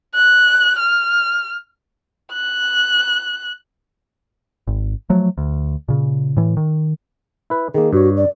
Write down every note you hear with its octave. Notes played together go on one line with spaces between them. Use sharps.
F#6
F6
F#6
G#1
F3 F#3 A3
D2
A#2 C#3
A2 E3
D#3
E4 B4
D#3 A#3 G#4
G2 F#4 C#5
D5